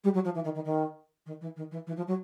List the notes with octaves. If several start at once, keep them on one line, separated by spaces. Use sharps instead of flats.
G3
F#3
F3
E3
D#3
D#3
D#3
D#3
E3
D#3
E3
E3
F3
F#3